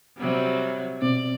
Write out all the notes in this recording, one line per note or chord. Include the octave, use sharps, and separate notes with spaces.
C3 F#3 G3
B2 C4 D5